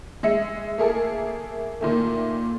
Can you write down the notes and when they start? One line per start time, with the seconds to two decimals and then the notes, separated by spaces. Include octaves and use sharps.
0.23 G#3 E5 C#7
0.78 A3 A#3 G#4 A4
1.81 A#2 D#3 A3